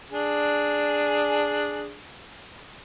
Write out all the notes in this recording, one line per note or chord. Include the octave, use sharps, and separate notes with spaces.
D4 G#4